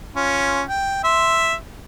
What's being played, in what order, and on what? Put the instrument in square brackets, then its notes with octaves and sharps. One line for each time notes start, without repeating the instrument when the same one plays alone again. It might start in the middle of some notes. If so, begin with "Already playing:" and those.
[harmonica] C#4 F4
G5
E5 C6